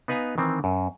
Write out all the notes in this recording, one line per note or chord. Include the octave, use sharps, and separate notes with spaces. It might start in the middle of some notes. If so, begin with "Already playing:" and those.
B3 D#4 B4 F5 G#5 A#5
D#3 E3 C4
F#2